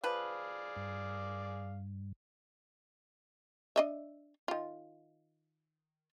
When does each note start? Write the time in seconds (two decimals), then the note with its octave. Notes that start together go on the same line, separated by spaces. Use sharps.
0.04 F3 G#4 B4 D5 F5
0.76 G2
3.76 D4 D#5 E5
4.48 D#3 F4